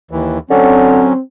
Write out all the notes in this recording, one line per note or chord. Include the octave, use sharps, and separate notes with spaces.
D#2 E3
D3 F#3 C4 C#4